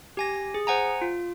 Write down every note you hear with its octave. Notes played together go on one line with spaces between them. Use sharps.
G4 G#5 A#6
G#4
C5 F#5 G#5 A#5
F4